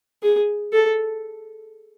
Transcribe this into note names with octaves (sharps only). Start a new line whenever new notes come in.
G#4
A4